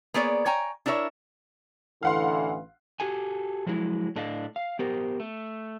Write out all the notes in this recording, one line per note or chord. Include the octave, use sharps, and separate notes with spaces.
A#3 B3 G#4 C#5 D5
C#5 G5 G#5 A#5
D4 E4 A#4 C#5 E5
A1 D3 E3 F5 F#5 C6
F#4 G4 A4 G#5
F3 F#3 G#3 E4
A2 D4 A4 D#5 F5
F5
B3 G4 A#4 C5
A3